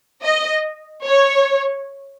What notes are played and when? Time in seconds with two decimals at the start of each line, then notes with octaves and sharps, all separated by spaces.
0.24 D#5
1.06 C#5